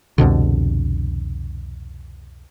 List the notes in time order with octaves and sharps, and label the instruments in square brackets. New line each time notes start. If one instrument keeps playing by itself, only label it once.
[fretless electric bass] C2 F2 B2 D3